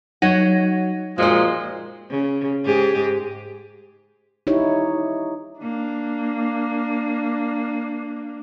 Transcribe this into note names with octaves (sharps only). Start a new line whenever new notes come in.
F#3 D#4 C#5 D#5 F#5
A#2 F3 G#3 F#4 C5
C#3
G#2 G4 G#4
D#4 E4 G4 C#5
A#3 D4